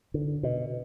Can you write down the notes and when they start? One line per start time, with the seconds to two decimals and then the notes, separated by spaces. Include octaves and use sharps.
0.14 D3
0.43 B2